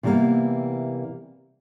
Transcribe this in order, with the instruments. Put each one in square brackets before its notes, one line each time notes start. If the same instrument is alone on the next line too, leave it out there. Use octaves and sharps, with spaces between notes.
[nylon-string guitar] C3 E3 G3 G#3 A#3 B3